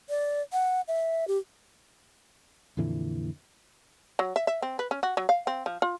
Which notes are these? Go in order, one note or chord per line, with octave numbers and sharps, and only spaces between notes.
D5
F#5
E5
G4
F2 A#2 D3 E3
F#3
E5
E5
C4
B4
C#4
F#4
F#3
F5
C4
F3
F4